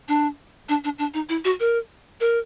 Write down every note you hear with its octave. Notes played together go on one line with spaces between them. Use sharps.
D4
D4
D4
D4
D#4
E4
F#4
A#4
A#4